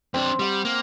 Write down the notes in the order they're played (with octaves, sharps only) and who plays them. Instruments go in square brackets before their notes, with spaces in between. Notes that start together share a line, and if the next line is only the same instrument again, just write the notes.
[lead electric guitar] F2 D4 [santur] C4 E6
[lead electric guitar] G3 [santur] C5 F#5
[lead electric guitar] A#3